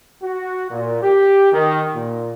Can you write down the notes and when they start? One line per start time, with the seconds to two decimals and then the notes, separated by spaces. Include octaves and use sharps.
0.23 F#4
0.71 A#2
1.03 G4
1.53 D#3
1.94 A#2